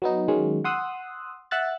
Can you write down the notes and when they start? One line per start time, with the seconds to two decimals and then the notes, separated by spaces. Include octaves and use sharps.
0.02 F#3 B3 D#4
0.28 D#3 F#3 G#3 C#4
0.64 F#5 C6 D#6 E6 F#6
1.51 E5 F#5 E6 F#6 A6